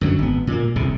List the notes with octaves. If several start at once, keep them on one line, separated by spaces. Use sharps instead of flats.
F#2 D3 E3 F#3
G#1 B3
A#2 A#3
D#1 C2 C3